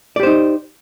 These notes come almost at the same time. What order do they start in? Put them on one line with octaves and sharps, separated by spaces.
D5 G4 C5 D#4